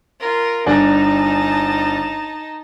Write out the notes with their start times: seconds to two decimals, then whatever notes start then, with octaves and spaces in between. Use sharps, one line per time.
0.20 F4 A#4
0.66 G1 D4 D#4 G#5 A5